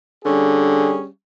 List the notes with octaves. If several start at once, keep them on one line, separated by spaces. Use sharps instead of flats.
D3 G3 C#4 G#4